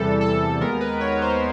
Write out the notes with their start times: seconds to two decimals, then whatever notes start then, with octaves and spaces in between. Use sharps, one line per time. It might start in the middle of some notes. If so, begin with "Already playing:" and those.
Already playing: E2 C3 E3 G3 A4
0.21 A4
0.61 D#2 D#3 G#3 B3 A#4
0.81 B4
1.01 C#5
1.22 C5